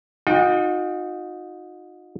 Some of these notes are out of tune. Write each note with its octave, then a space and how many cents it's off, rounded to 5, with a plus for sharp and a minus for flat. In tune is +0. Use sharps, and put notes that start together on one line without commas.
D#4 +0 F#4 -45 G5 +10